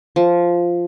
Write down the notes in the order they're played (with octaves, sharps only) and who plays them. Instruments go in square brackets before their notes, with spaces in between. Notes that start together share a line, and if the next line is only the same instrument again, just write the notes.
[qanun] F3